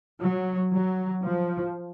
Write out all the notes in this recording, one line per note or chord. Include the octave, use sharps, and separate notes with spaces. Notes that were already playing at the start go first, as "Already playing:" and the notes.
F#3
F#3
F3